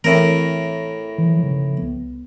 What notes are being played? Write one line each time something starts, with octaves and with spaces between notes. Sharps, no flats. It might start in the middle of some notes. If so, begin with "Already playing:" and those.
A2 E3 A3 C4 A#4
E3 F3
C#3 F3
C2 B3